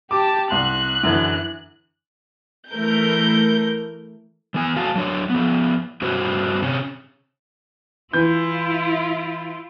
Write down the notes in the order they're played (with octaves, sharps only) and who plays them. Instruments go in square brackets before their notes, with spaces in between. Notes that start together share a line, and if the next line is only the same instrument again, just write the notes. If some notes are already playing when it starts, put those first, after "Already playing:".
[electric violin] G4 A5 [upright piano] D6
[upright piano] C2 C6 [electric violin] F#6
[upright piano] F#2 D3 E3
[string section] E3 A3 A#4 G6
[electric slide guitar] E3 B3 G#5
A3 F#4 F5 G#5 A5
F#3 D4 C#5
F3 B3
G2 C#4 F#4 B4 C5
C3 C#4
[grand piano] E3 G6 [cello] E4 F4